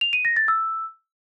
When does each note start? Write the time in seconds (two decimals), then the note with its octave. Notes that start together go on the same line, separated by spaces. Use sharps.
0.01 F7
0.13 D#7
0.25 A#6
0.37 A6
0.48 E6